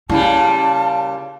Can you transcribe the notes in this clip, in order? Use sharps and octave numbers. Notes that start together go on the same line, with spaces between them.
A#2 C#3 G3 E4 A5